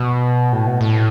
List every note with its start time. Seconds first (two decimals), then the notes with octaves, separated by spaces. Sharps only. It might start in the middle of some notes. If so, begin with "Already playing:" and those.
Already playing: B2
0.52 A2
0.67 B2
0.81 A2